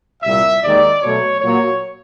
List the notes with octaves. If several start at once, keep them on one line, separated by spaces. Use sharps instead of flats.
C2 A#2 G3 E5
D#2 D#3 G#3 D5
B2 F#3 A3 C#5
A#2 F#3 A#3 C#5